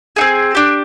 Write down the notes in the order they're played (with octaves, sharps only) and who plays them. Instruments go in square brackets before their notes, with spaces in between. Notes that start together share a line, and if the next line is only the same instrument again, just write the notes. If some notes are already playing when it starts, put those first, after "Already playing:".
[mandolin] D#4 G#4
C4
D4 G4